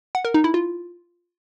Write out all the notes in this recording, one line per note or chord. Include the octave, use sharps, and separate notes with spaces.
F#5
A#4
D#4
E4
F4